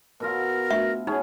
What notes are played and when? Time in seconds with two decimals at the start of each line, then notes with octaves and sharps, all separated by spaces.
0.20 B2 E4 F4 A#4
0.71 A3 D4 F#4 E5
1.07 B3 C#4 D#4 G#4